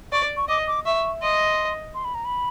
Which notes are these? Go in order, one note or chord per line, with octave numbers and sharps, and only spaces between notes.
D5 C#6
C#6
D#5 D6
D6
E5 C#6
D#5 C6
C6
B5
A#5
B5